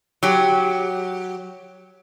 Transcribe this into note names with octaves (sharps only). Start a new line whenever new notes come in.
F#3 G4